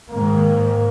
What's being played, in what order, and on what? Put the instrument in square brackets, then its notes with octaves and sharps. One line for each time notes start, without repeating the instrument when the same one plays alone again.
[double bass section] G#2 D#3 A#3